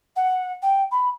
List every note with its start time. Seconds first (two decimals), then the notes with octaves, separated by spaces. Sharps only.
0.15 F#5
0.62 G5
0.91 B5